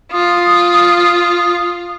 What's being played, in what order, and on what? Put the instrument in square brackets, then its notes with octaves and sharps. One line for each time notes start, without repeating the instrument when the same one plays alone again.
[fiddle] F4 [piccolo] D#6